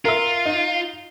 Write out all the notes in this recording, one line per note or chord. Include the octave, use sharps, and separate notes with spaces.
F4 A#4 E5
D#4